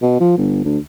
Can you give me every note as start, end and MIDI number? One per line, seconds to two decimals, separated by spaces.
0.02 0.19 47
0.20 0.33 53
0.37 0.64 31
0.64 0.78 38